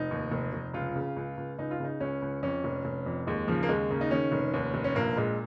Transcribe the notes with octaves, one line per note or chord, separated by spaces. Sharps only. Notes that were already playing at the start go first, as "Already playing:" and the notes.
Already playing: F1 D#4
D#2
F1
F1
C#2 F4
C#3
C#2
C#2
C#2 D#4
F4
C#3 D#4
C#2 C#4
C#2
F2 C#4
F1
F1
F2
D#2 G#3
C#3 F3
A#3
D#2 G#3
C#3 A#3
D#4
D#3 C#4
F1
D#2
F1
C#4
A#1 A#3
A#2 G#3